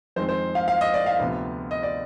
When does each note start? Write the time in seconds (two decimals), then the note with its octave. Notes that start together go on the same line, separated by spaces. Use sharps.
0.16 F2 D#3 G#3 C4 C5
0.29 C5
0.55 F5
0.68 F5
0.81 D#5
0.94 D5
1.06 F5
1.19 D2 C3 F3 B3
1.71 D#5
1.83 D5